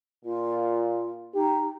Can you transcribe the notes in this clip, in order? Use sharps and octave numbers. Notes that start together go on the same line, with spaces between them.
A#2 F4
D#4 G4